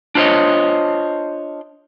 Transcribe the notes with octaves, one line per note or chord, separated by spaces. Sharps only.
D4 F4 C5 C#5 D#5